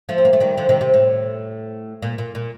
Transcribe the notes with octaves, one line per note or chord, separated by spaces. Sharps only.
F3 A3
C4
A#3
A3
D#3 G3
D3 F3
C3 D#3
C3
A2
A#2
A#2
A#2